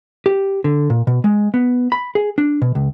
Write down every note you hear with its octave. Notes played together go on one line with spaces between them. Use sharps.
G4
D3
A#2
B2
G#3
B3
B5
G#4
D4
B2
C#2